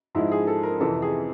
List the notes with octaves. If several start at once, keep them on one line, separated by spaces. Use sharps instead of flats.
G#2 F3 G#3 E4
G#4
A4
A#4
F2 C3 E3 A4
G#4